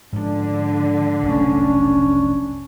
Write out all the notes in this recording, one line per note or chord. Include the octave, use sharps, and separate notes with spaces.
G#2 D3 F3 D4
F1 B1 A3 C#4